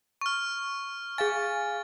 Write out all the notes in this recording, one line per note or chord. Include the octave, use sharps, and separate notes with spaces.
C#6 F6
G#4 F5 G#5 A6